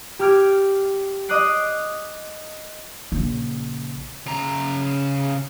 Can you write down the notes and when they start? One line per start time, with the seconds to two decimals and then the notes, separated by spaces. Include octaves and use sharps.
0.19 G4 D6 F6 G#6 D7
1.28 D#5 D6 D#6 F#6 C7 D7
3.12 A#1 C#3
4.26 C#3 A#5